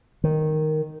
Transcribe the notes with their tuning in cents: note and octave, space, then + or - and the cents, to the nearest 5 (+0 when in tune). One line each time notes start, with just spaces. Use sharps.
D#3 -5